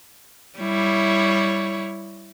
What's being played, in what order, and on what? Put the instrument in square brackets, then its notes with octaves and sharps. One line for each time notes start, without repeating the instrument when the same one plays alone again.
[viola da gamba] G3 E4 C#5